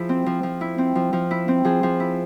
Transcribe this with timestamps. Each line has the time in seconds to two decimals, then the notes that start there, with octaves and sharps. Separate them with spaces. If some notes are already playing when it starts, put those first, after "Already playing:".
Already playing: F3 E4 G#4
0.09 C4
0.26 F3
0.43 F3
0.61 E4
0.78 C4
0.95 F3
1.13 F3
1.31 E4
1.48 C4
1.65 F3 G#4 C5
1.83 F3
2.00 E4